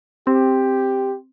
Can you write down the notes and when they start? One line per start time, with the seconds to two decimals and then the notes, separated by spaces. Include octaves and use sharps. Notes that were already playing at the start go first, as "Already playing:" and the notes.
0.27 C4 G4